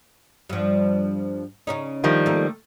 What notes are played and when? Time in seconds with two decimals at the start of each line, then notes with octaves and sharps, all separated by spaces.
0.49 G2 F3
1.67 C#3 C#4 D#4
2.04 D#3 F3 G3
2.26 A3 A#3